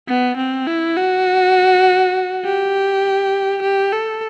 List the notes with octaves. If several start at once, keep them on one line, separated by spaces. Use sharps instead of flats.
B3
C4
E4
F#4
G4
G4
A4